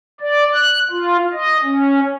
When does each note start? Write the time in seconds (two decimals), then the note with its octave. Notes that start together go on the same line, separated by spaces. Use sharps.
0.20 D5
0.53 F#6
0.91 F4
1.33 D#5
1.62 C#4